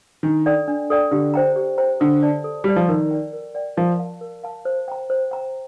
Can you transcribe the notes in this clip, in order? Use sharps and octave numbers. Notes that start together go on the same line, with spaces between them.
D#3 D4
A4 D5 G5 A#5
D4
A4 D5 G5 A#5
D3 G4
C5 G5 A#5
G4
C5 G5 A#5
D3 A4
D5 A5
A4
G3 D5 A5
F3
D#3 A#4
D5 G5
A#4
D5 G5
F3 A#4
F5 A5
A#4
F5 A5
C5
G5 A#5
C5
G5 A#5